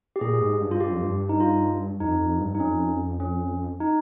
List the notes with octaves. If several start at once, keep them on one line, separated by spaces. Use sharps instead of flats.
G4
A#2 G#4
G#2
G2
F4
G2 G4
F2
G2
D#4
F4
F2 D#4
F2
G2
D#4
F2 C#4
C#4
D#4